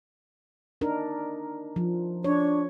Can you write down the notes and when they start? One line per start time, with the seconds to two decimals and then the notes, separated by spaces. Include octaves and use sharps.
0.81 D4 D#4 A#4
1.76 F3
2.24 D4 C#5